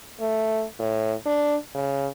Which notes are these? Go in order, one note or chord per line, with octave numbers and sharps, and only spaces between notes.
A3
A2
D4
C#3